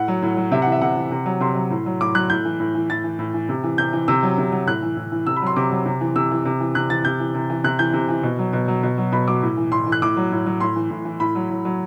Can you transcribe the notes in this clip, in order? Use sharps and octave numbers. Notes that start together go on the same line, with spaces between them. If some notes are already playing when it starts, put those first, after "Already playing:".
Already playing: A2 F#5
F#3
A2
F#3
C3 E5
F#5
E3
E5
C3 F#5
E3
C3
F#3
C3 C6
F#3
A2
F#3
A2 D6
F#3 F#6
A2 G6
E3
A2
E3
A2 A6
E3
A2
E3
C3
E3
C3 G6
E3
C3 E6
F#3
C3
F#3
A2 F#6
E3
A2
E3
C3 E6
B5
F#3 C6
C3 D6
F#3
C3
E3
C3 E6
E3
C3
E3
C3 F#6
E3 A6
C3 G6
E3
C3
E3
C3 F#6
E3 G6
C3
E3
B2
F#3
B2
F#3
B2
F#3
B2 B5
F#3 D6
A2
E3
A2 C6
E3
F#6
A2 D6
F#3
A2
F#3
A2 C6
E3
A2
E3
A2 B5
F#3
A2
F#3